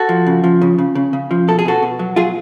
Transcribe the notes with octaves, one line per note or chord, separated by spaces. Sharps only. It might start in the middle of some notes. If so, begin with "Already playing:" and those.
Already playing: F#4 A4
F3
C#3
F3
C#3
C#3
C#3
C#3
F3
B2 A4
G#4
B2 F#4 A4
B2
F#3
F#3 F4 G#4